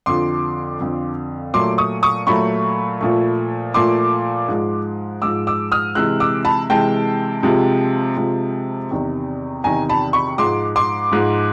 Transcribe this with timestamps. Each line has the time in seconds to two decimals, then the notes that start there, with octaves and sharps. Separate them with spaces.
0.06 F2 D3 F3 C6 D6
0.80 F2 D3 F3
1.54 A#2 F#3 A3 C6 D6
1.78 C#6 D#6
2.03 C#6 D#6
2.27 A#2 F#3 A3 B5 C#6
3.01 A#2 F3 A3
3.74 A#2 F3 A3 C6 D6
4.48 G#2 F3 G#3
5.22 G#2 F3 G#3 D6 E6
5.47 D6 E6
5.72 D#6 F6
5.95 C3 E3 G#3 E6 F#6
6.20 D6 E6
6.45 A5 B5
6.70 C3 E3 G#3 G5 A5
7.43 C3 F3 G#3
8.17 C3 F3 G#3
8.91 E2 C3 D#3
9.64 E2 C3 D#3 G#5 A#5
9.89 A5 B5
10.13 B5 C#6
10.38 G#2 F3 G#3 C6 D6
10.76 C6 D6
11.12 G#2 F3 G#3